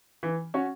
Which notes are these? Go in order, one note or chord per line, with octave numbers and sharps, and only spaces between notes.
E3
C#4 F#4 C#5